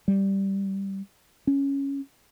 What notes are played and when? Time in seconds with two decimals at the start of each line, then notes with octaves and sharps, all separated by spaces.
0.08 G3
1.47 C#4